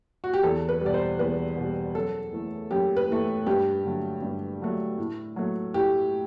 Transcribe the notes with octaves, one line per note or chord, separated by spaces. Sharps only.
F#4
G4
E2 A4
B4
B2 G3 D5
C5
E2 B4
B2 G3
F#2 A4
E3 A3
F#2 G4
B4
E3 A3
G2 G4
D3 F#3 A3
G2
D3 F#3 A3
A2
F#3 A3
A2 G4